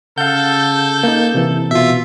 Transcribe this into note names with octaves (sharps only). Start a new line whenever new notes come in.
C#3 A4 F5 F#5 G6
A#3 D#4
C3 E3
B2 F4 E5